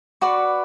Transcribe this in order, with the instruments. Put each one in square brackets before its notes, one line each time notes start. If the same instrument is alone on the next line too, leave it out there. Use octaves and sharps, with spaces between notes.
[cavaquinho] F#4 B4 D5 C#6